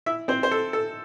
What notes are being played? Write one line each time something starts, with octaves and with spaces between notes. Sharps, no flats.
E4 E5
C4 C5
C5
A4
A4